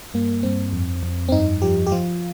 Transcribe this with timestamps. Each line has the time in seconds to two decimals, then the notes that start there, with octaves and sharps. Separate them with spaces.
0.14 G2 A#3
0.43 G2 C4
0.73 F2
1.03 F2
1.29 C4
1.32 G2 D#4
1.62 F3 G4
1.87 G4
1.91 F3 F4